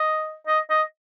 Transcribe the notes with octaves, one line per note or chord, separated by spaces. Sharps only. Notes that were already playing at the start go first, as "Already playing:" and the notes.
Already playing: D#5
D#5
D#5